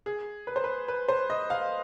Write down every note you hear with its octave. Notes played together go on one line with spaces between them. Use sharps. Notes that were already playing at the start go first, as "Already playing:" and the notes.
G#4
B4
C5
B4
B4
C5
D#5
F5